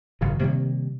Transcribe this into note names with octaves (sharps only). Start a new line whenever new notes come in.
G#1 F#2 C#3 E3
C3 D#3 G3 A#3